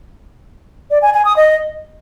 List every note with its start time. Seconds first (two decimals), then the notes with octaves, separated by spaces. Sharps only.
0.91 D5
1.02 G#5
1.14 G#5
1.25 D#6
1.37 D#5